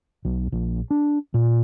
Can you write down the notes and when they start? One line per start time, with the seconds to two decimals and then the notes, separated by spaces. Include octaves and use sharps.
0.25 B1
0.52 A#1
0.91 D4
1.34 A#2